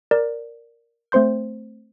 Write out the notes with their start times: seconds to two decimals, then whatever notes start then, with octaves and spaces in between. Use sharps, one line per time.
0.11 A#4 D5
1.12 A3 C4 C5 C6 G6